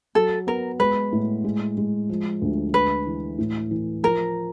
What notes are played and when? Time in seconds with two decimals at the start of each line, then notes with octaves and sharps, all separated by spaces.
0.15 F#3 A4
0.47 B3 A#4
0.80 G#3 B4
1.12 A2
1.44 G#3
1.78 G#3
2.09 F3
2.42 D2
2.74 G#3 B4
3.07 E3
3.39 A2
3.71 E3
4.03 F3 A#4